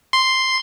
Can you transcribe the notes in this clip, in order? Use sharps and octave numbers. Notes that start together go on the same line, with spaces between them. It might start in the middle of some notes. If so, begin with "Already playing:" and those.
C6